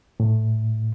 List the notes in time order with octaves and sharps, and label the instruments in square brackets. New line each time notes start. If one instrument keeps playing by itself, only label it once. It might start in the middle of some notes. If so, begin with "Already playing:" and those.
[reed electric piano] A2